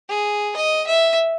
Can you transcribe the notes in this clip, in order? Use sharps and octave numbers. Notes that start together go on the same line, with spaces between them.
G#4
D#5
E5